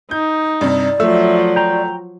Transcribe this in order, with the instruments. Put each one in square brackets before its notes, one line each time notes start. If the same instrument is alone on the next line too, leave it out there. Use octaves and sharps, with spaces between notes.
[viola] D#4 [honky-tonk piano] G6
[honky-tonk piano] G2 C3 [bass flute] D5
[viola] F3 F#3 [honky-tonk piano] A3 [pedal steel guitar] E5
[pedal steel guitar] G5 A#5